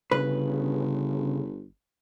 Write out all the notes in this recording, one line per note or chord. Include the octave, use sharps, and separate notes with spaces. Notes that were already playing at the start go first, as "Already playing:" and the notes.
G1 C#3 B4